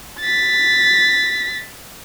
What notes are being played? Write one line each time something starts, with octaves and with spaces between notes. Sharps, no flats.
A6 B6